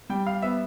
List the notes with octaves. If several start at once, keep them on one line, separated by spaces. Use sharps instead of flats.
G3 G5
F5
B3 E5